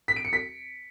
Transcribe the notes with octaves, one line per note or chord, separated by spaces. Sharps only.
B6
D7
C#7
B6